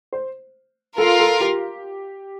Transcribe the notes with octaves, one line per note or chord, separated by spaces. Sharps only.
C5
F4 A4 A#4 F5
A4
G4